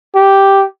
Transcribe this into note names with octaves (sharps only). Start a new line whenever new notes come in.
G4